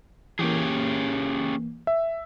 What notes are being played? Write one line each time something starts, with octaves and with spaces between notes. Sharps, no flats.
E3 A#3 C#4 G4 G#4
E5